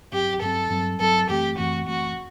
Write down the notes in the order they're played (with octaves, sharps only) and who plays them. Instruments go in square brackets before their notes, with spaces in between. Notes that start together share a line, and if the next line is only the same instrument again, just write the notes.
[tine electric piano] G2 F#3 C4 [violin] G4
[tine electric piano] G2 F#3 C4 [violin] A4
[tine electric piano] G2 F#3 C4
[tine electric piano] G2 F#3 C4 [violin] A4
[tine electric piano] F#2 E3 A3 C4 [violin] G4
[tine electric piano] F#2 E3 A3 C4 [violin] F#4
[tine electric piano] F#2 E3 A3 C4 [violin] F#4